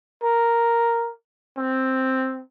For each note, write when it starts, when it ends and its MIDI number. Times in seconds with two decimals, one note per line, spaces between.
0.23 1.11 70
1.58 2.41 60